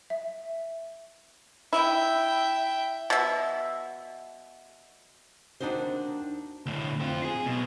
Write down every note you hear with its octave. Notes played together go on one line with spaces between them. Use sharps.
E5
E4 E5 G5
B2 E5
D#2 D3 D4 D#4 F#4 C5
D2 A2
C4 F4
G#4
B1 B2